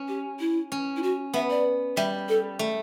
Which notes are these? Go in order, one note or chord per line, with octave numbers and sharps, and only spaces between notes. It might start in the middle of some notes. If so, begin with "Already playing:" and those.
Already playing: C#4
G4
E4
C#4
E4
F#4
B3 E5
D5
G3 E5
A4
A3